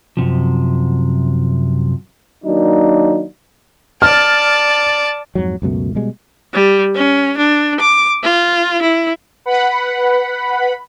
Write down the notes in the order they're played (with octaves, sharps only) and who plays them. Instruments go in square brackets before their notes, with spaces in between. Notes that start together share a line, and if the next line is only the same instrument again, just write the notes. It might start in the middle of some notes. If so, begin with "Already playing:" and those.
[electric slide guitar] F#2 C3 F3
[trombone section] D#3 F#3 A#3 D4 D#4
[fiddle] D5 A5 [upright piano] F6
[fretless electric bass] F2 G#2 F#3
C#2 F#2 B2 A3
B2 G3 G#3
[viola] G3
C#4
D4
D6
F4
E4
[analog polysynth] B4 F#5 B5